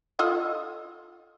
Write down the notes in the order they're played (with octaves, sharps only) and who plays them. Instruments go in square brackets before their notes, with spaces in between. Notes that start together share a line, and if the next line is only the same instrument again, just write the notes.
[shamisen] F4 A4 D#5